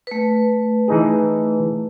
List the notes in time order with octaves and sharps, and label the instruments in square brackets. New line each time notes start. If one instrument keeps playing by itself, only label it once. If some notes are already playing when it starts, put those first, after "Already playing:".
[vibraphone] A3 B4
[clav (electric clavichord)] E3 D#4 G#4